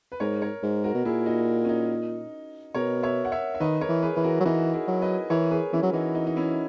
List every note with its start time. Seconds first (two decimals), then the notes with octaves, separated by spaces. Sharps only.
0.12 B4
0.20 G#2 A#4 C#5
0.41 A#4 C#5
0.63 G#2
0.84 F#4 A#4
0.94 B2
1.05 A#2 E4 G#4
1.26 D#4 F#4
1.65 C#4
1.69 D#4
2.74 B2 A#4 C#5
3.03 C#5 E5
3.25 F#5
3.32 C#5 E5
3.54 E5
3.60 D#3 B4 D#5
3.81 A#4 C#5
3.89 E3
4.02 G#4 B4
4.16 E3 B4
4.24 F#4 A#4
4.40 F#3
4.45 E3 D#4 F#4
4.73 E4 G#4
4.88 F#3
5.01 B4 D#5
5.30 E3 A#4 C#5
5.51 G#4 B4
5.73 E3 C#4 E4
5.83 F#3
5.93 E3 D#4 F#4
6.15 D#4
6.27 D#4
6.36 C#4 E4